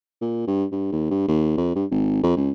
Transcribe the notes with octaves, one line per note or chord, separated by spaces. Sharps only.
A#2
G2
G2
D#2
G2
D#2
F2
G2
G#1
F2
C#2